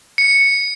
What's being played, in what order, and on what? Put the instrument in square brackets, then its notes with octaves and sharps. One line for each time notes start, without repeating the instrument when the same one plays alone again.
[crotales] C#7